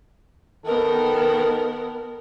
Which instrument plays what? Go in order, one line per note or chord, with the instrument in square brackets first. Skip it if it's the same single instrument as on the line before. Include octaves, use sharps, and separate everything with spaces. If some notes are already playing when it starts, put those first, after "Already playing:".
[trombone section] D#3 A4 [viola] B3 A#4